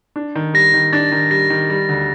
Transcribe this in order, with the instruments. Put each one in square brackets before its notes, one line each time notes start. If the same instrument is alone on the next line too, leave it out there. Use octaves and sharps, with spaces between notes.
[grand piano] D4
D#3
[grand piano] G3 [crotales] A#6
[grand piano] D#3
[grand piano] D4 [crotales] A6
[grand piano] D#3
[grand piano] G3 [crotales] A#6
[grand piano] D#3
G3
D2